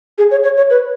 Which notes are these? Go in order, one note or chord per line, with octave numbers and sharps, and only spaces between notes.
G#4
C#5
C#5
C#5
B4